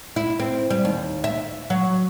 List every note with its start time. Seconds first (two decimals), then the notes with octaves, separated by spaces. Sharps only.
0.16 E4
0.40 C4
0.70 G3
0.85 D#2
1.24 E5
1.70 F#3